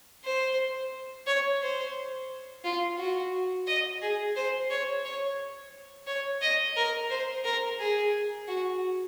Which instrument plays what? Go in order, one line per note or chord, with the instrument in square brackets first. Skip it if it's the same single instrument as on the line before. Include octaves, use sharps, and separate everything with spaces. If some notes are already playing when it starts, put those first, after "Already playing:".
[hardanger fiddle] C5
C#5
C5
F4
F#4
D#5
G#4
C5
C#5
C#5
C#5
D#5
A#4
C5
A#4
G#4
F#4